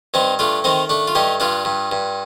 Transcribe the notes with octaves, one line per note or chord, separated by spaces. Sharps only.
G2 C4 D#4
A3 D4 F4
D#3 C4 D#4
A3 D4
F4
G2 D#4 G4
G2 D4 F4
G2
G2